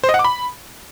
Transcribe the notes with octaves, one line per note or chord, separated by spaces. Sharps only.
C5
D#5
F#5
D6
B5